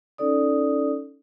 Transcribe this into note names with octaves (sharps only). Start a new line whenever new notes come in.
C#4 D#4 A4 D5 D#6